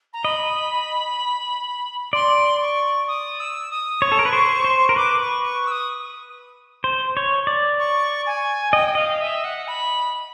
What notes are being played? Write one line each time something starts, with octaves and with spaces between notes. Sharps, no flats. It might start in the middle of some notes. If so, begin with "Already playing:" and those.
A#5
D#5 B5
D5 C6
C#6
D#6
E6
D#6
C#5 C#6
A4
A#4
B4
C5
C5
A#4
B4 D6
C#6
C#6
E6
D#6
C5
C#5
D5
C#6
G#5
D#5 G5
D#5 F5
E5
F#5
B5